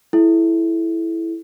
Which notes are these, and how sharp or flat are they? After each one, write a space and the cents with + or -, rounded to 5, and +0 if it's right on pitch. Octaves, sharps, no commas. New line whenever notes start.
E4 +0 A4 -35